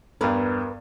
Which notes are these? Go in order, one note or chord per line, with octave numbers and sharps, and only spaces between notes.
E2 G2 A#4 B4